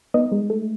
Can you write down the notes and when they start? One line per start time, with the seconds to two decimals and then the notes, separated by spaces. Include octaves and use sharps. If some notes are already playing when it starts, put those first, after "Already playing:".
0.14 B3 D#4
0.32 G#3
0.50 A3